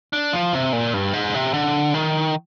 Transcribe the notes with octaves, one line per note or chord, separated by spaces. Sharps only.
D4
F3
C3
A#2
G2
G#2
C3
D3
D#3